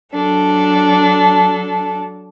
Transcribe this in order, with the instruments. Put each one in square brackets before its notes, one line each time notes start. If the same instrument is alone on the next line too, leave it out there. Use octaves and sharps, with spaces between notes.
[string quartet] F#3 D4 A4